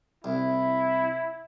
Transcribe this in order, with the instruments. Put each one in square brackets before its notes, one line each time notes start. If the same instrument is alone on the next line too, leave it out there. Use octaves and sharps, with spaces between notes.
[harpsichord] C2 [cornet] E4